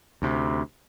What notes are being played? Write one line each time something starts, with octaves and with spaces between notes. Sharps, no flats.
D2 C3